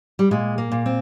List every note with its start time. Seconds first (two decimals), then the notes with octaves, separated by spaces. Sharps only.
0.19 G3
0.31 A#2 G#3
0.58 A#3
0.72 A#2
0.86 C4